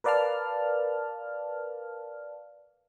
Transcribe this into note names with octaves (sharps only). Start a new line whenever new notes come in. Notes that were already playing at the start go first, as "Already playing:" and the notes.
A#4 B4 D5 F5 A5 F6